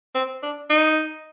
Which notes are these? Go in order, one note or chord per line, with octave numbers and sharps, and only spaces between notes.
C4
D4
D#4